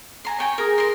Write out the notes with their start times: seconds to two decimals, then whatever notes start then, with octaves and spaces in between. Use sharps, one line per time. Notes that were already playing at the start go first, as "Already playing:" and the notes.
0.25 G#5 A#5 C6
0.38 C#5 G5 G#5
0.58 G#4 A#4 A#5 D#6
0.78 A#4 C6